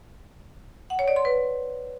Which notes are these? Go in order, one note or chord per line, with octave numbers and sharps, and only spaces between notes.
F#5
C#5
D5
C6
B4